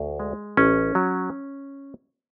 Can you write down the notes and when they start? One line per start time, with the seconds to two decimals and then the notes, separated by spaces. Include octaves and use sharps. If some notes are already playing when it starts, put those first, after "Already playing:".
Already playing: D2
0.20 G#3
0.57 A1 C#4
0.95 F#3